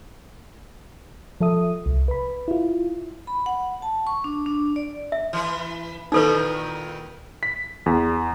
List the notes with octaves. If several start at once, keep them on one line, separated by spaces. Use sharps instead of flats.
F3 A4 E5 D#6
C2
B4 B5
E4 F4
B5
F#5
A5
C#6
D4
D4
D5
E5
E3 B4
A#2 D#3 E3 D#4 A4 B4
B6
E2